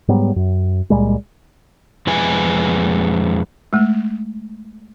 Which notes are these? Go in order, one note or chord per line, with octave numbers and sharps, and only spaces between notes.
G#2 F#3 G3 B3
F#2
C#2 A#2 G3 G#3
F2 G#3 B4 G#5
G#3 A3